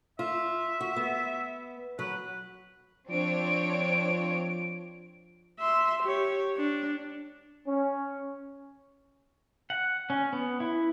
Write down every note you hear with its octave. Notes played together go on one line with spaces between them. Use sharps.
F4 E5
F#4
B3
F#3 B4
F3 C4 D4 C#5 D7
E5 C6
G4 C#5
D4
C#4
F#5
C#4
B3
E4